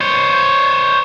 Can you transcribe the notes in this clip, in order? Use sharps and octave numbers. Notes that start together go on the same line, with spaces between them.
C5 C#5